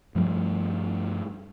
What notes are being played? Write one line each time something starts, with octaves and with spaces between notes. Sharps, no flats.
G2 F3 G3 A3